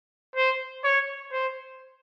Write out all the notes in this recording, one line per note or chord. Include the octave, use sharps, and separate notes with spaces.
C5
C#5
C5